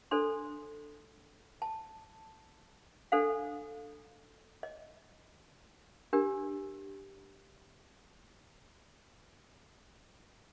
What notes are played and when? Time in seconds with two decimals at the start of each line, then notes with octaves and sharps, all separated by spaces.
0.11 D4 A4 C5 C6
1.62 A5
3.12 D4 A4 C5 F5
4.63 D#5
6.13 D4 G4 A#4